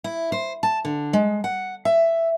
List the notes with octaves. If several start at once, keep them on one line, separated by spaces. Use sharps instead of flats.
E4
C5
A5
D3
G#3
F#5
E5